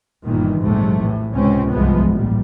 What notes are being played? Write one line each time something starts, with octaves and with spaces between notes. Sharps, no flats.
G1 G2 A#2 D#3 E3
A#1 E2 G#2 C3 F#3 A3
A2 E3
C#2 C3 C4 C#4
C2 G2 E3 F3 G#3 B3
A1 A#2 G3